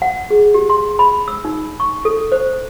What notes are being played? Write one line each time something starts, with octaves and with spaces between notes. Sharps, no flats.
F#5
G#4
G4
C6
B5
E6
D#4
C#6
A4
C5